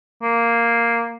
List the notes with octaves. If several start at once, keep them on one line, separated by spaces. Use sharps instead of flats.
A#3